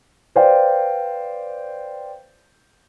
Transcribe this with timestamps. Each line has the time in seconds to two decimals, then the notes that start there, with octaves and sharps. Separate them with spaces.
0.35 B4 C5 D5 F5 G5